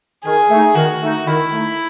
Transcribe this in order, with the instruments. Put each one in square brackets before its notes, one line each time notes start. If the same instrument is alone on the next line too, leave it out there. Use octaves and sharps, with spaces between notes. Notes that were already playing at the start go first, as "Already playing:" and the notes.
[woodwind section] D#3 [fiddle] G#4
[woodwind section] A3 D#4
[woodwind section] D#3 [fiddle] F#4
[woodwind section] A3 D#4
[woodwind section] D#3 [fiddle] E4
[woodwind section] A3 D#4